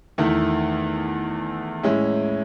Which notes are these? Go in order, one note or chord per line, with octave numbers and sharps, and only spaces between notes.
E2 D#3 A3 E4
A2 G#3 C#4 E4